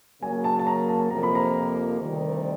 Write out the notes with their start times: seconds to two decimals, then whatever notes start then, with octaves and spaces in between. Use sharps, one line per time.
0.22 C#3 F#3 A#3 G#5
0.44 A5
0.59 A5
0.67 A#5
0.89 A5
1.11 F2 C3 F3 A#3 A#5
1.23 B5
1.35 A#5
2.00 D2 C3 D#3 G3